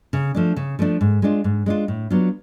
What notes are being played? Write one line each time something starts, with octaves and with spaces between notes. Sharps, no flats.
C#3
F3 A3 D4
C#3
F3 A3 D4
G#2
G#3 D4 F4
G#2
G#3 D4 F4
A2
F#3 B3 D4 F4